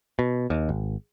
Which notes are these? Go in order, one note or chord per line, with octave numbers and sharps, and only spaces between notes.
B2
D#2
G#1